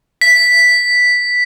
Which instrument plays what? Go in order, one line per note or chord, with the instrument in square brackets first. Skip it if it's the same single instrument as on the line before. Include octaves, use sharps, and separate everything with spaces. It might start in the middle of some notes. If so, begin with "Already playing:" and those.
[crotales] B6